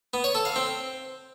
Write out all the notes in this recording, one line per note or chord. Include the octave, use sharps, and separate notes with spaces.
B3
C#5
A4
F5
C4